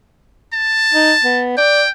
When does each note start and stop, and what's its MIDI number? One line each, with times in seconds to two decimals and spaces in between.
0.54 1.44 81
0.93 1.13 63
1.24 1.56 59
1.58 1.83 74
1.58 1.90 79